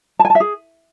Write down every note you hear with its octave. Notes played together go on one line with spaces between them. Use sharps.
A5
G#5
A5
E5
G#4